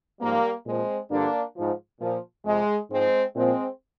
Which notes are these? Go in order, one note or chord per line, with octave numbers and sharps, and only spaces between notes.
G#2 F3 G3 A#3
A#2 F3 G#3 C4
G2 D3 F3 A#3 D4
G#2 F3
A#2 F3
F2 C3 F3 G#3
G#2 F3 G#3 C4
A#2 F3 G#3 C4